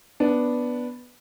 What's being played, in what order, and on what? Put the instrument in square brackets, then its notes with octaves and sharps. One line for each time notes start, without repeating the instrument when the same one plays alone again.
[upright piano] B3 D4